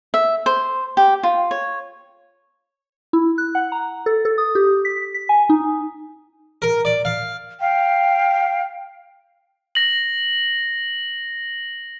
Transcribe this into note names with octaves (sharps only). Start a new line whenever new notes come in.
E5
C5
G4
F4
C#5
E4
F#6
F#5
A#5
A4
A4
D#6
G4
B6
B6
G#5
D#4
A#4
D5
F5
F5 G5
A#6 F#7